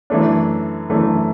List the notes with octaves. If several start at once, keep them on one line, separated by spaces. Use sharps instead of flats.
F#2 E3 A3 D4
F#2 E3 A3 D4